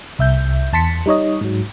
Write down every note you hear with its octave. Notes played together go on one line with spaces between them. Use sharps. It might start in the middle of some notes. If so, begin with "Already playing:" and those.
C2 E5 G6
E2 A5 C6 B6 C#7
G3 D#4 C#5 D#5
G#2 F#3